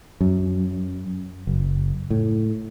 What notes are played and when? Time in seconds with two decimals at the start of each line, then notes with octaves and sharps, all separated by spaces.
0.21 F#2
1.47 F#1
2.10 A2